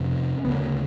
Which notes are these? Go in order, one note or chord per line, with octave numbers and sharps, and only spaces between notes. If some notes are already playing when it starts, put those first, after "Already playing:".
Already playing: F2 C3 C#4
D2 C#3 B3
A#3